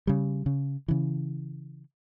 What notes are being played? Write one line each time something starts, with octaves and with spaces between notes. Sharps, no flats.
C#3 G3
C#3
C#3 E3